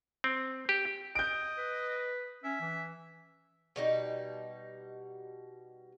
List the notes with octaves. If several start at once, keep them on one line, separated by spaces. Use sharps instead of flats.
C4
G4
D#5 G6 D7
B4
C#4 E5
E3
B2 G3 D#4